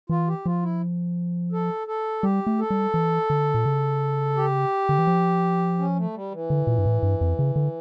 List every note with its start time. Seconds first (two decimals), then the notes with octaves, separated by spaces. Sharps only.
0.09 E3 F4
0.28 G4
0.45 F3 F4
0.63 E4
1.52 A4
1.87 A4
2.23 G3 G4
2.47 A3
2.59 A4
2.70 G3
2.94 E3
3.30 D3
3.54 A#2
3.66 C#3
4.36 G4
4.89 D3
4.99 E3
5.07 F3
5.79 C#4
5.96 A3
6.14 G3
6.32 E3
6.50 D3
6.67 A#2
6.78 G2
6.86 A2
7.03 G2
7.21 F2
7.39 C#3
7.56 D3